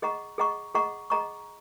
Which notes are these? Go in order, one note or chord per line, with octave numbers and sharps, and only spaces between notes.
G#4 D#5 F#5 A#5 C#6
G#4 D#5 F#5 A#5 C#6
G#4 D#5 F#5 A#5 C#6
G#4 D#5 F#5 A#5 C#6